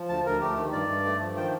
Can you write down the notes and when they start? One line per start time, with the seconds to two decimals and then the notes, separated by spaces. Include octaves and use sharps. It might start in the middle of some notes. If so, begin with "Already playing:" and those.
Already playing: F3
0.09 D2 A5
0.25 D2 A#4
0.41 A3 G4
0.57 D#3
0.72 G2 D5
0.88 G2
1.05 A3
1.21 F3
1.37 D#3 G5